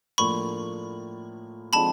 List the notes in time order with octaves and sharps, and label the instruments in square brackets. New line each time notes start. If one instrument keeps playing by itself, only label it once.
[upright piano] A2 F3 A#3 D4 [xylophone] B5 C#6
[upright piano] D3 F3 G#3 C4 D#4 [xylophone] A5 B5